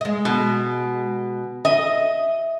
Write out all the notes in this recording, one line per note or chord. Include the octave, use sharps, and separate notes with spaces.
G#3 D#5
B2
D#5 E5